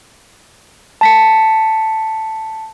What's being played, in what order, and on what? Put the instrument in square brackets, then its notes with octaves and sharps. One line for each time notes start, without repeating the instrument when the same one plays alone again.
[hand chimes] A5 B6 C#7